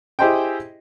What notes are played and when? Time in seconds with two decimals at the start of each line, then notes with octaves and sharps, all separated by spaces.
0.19 E4 G4 G#4 C5 D#5 G5